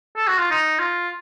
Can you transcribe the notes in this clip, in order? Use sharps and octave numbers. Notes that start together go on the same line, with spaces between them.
A4
F#4
F4
D#4
F4